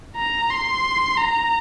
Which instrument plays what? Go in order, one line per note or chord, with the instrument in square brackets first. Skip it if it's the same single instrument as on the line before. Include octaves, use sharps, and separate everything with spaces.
[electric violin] A#5
C6
A#5